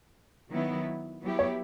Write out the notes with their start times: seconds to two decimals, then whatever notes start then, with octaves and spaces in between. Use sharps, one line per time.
0.50 D#3 F#3 B3 E4
1.21 F#3 B3 E4 G4
1.39 C#5